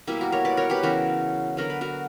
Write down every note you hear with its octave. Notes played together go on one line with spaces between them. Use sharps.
B2 G3 A#3 E4 G4
F#4 A#4
A#4 C#5
B4 D5
A#4 C#5
G4 B4
C#3 E3 B3 F#4 A#4
D3 F#3 B3 A#4
B4
F#4 A#4